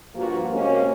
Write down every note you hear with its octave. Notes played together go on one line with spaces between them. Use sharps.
G2 A#2 F3 A#3 F#4
C3 G#3 A#3 C#4